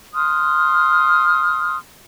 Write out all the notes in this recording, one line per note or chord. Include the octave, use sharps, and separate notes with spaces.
C6 D#6 F6 F#6